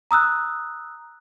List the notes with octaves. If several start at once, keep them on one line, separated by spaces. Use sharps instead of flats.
A#5 D#6 E6 F#6